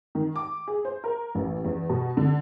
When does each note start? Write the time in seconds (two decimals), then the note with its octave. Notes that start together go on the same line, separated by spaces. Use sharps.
0.15 D#3
0.36 D6
0.68 G#4
0.85 C5
1.04 A#4
1.35 A1
1.65 E2
1.89 B2
2.17 D3